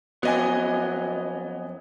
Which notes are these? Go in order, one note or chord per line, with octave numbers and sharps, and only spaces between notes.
F2 F#3 B3 D#5 G#5